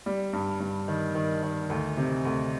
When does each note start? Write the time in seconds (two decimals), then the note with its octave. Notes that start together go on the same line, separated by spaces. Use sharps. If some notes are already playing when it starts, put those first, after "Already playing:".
0.06 G3
0.33 G2
0.60 G2
0.88 D#3
1.15 D#3
1.43 D#3
1.70 D2
1.97 C3
2.25 D2